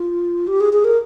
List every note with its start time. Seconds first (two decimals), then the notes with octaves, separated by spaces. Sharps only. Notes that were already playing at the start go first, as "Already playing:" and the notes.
Already playing: F4
0.47 G4
0.60 G#4
0.73 G#4
0.84 A#4